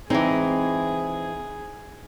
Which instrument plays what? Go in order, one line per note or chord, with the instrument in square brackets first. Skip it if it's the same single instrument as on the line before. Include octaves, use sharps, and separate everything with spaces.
[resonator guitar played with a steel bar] E3 G#3 [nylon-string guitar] C4 D#4 [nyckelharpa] G#4